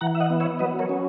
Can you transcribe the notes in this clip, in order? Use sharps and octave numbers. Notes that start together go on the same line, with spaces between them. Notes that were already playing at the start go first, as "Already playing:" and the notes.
E3 F#5 A#5
E5
D#5 F#5
B3
C#5 E5
F#3 B4 D#5
A#4 C#5
C#4